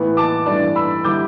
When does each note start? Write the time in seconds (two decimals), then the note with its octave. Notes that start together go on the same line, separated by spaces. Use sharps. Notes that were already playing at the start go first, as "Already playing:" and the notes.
Already playing: A2 E3 B3
0.17 A5 D6
0.46 G2 E3 A3 D4 D5
0.76 B5 E6
1.04 D3 G3 E4 D6 G6